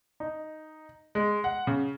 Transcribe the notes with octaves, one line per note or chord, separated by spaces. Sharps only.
D#4
G#3
F#5
C#3